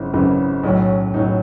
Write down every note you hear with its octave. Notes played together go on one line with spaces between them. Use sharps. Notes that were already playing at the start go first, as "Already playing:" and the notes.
Already playing: G#1 F#2 C#3 E3
G#1 F#2 C#3 E3
B1 A2 F#3 C#4
B1 A2 F#3 D#4